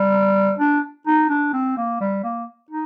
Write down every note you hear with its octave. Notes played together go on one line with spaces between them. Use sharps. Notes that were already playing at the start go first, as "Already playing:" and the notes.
Already playing: G3
D4
D#4
D4
C4
A#3
G3
A#3
D#4